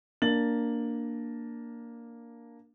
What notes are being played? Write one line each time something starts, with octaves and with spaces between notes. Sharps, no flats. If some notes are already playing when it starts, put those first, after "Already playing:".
A#3 D4 A6 F#7